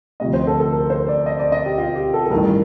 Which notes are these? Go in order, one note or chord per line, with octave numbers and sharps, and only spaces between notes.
D2 C3 F3 D#5
C5
A4
A4
A#4
C5
D5
D#5
D5
D#5
G4
F4
G4
A4
A4
A1 G2 D#3 A#4